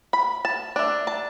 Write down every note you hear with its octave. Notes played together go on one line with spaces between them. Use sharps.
B5
A5
A3 D4
A5